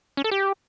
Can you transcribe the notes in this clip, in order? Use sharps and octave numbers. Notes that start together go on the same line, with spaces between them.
C#4
A4
G4